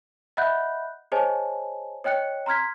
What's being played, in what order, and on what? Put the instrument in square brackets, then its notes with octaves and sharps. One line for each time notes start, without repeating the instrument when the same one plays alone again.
[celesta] D#5 E5 F#5 B5 F#6 G6
G#4 C5 C#5 D#5 G#5 A5
C#5 D#5 G5 F#6 C#7
A#5 C6 F6 G#6 B6